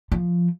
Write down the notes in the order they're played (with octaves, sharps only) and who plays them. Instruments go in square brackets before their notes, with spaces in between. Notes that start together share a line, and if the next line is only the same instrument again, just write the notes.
[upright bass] F3